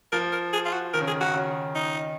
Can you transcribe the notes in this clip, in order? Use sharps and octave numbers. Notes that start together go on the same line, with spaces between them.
F3 A#4
A#4
G#4
F4
F#4
D#3 A#4
C#3
D#3 G#4
D#3 F#4
C#3
D#4